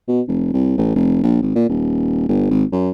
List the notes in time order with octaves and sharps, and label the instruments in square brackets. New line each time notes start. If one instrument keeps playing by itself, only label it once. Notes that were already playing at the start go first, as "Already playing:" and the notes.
[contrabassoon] B2
F1
C2
A1
F1
A#1
G#1
A#2
D#1
G1
G#1
F#2